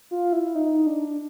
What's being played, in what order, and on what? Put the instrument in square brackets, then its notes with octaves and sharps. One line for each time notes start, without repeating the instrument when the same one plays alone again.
[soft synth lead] F4
E4
D#4
D4